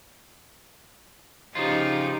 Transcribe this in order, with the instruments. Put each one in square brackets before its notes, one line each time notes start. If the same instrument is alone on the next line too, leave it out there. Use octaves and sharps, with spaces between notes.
[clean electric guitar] C#3 F3 F4 [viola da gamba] D#4 G4